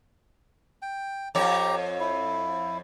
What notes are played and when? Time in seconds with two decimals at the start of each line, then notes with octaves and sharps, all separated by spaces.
0.82 G5
1.35 F2 G4 C#5 A#5
2.00 E4